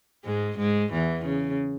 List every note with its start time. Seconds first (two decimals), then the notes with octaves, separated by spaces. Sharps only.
0.25 G#2 G#3
0.58 G#2 G#3
0.92 E2 E3
1.25 C#3